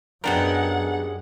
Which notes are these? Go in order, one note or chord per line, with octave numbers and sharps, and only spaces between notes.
F#2 B3 D4 D#4 G4 G#4 A#4 F#5